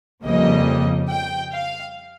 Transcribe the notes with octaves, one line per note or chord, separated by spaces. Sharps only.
F2 C#3 G3 A#3 D#5
G5
F5